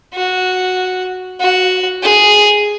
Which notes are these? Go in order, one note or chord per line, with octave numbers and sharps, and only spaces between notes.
F#4
F#4
G#4